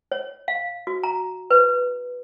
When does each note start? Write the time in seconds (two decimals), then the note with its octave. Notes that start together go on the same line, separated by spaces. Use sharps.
0.12 C#5
0.48 F5
0.87 F#4
1.04 A#5
1.51 B4